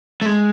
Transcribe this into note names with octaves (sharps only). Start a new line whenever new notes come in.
A3
G#3